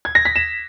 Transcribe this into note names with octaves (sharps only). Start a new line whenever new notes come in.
G#6
A#6
B6
E7